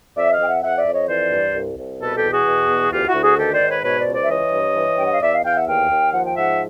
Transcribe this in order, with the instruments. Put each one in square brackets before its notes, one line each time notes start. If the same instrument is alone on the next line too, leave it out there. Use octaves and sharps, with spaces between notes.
[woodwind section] F2 D5 E5
D#5 F5
F2 G5
E5 F#5
F2 E5 F#5
D5 E5
F2
C#5 D#5
E3 C5 D5
G2
C2
C2
B2 A4 B4
G4 A4
E2
F#4 G#4
B2
E2
D2 F4 G4
E4 F#4
D2
F#4 G#4
D#3 G4 A4
C5 D5
G#2
B4 C#5
B2 B4 C#5
C5 D5
C#2
C5 D5
E5
E3 C#5 D#5
G2
E3
G2 G5
F#5
F5
E2 D5 E5
D#5 F5
E2 F5 G5
E5 F#5
D#2 F5 G5
D#2
F3 F#5
G5
G#2 E5 F#5